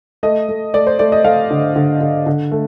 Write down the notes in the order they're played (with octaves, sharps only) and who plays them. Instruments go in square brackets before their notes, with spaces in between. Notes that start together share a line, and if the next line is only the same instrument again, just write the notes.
[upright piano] A3 D#5
A3
A3 D5
C5
A3 D5
D#5
A3 F5
D3
D3
D3
D3
A3